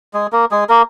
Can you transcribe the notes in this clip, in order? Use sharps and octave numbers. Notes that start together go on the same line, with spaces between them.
G#3 G#4
A#3 A#4
G#3 G#4
A#3 A#4